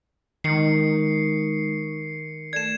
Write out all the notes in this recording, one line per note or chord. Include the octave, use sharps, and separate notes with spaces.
D#3 G#3 D#4 C#6 C7 C#7
A3 A4 D5 G#6 E7